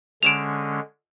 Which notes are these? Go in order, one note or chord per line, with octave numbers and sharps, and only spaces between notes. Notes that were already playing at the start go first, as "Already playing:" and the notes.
D3 G#3 C#4 D7 E7 F7